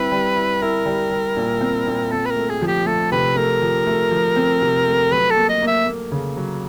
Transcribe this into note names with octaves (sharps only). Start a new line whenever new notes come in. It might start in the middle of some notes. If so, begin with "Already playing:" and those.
Already playing: G3 C4 E4 B4
G3
E4
E4 A#4
G3
G3
A#2
C4
A#2
C4 A4
B4
A#4
A3
G#4
F3
G4
A3 A4
C3 B4
A3 A#4
F3
A3
F3
C4
C3
A3
F#3 B4
A4
A#3
D#5
A#3
E5
A#3
C#3
F#3